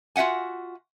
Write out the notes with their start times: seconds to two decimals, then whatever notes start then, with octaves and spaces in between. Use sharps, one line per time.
0.16 F4 F#4 E5 F#5 G#5